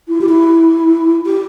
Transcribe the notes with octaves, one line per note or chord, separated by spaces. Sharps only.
E4
G4
E4
G4